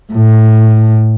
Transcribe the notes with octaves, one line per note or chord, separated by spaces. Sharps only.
A2